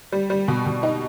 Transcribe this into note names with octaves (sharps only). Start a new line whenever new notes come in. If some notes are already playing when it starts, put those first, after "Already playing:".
G3
G3
B2
B2
D#4